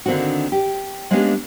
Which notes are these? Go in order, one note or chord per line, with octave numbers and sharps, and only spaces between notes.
D3 D#3 A#3 C4 D4 F#4
G4
G#3 A#3 B3 C#4 D4 G4